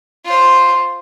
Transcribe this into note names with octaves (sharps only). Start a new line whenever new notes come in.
F4 C5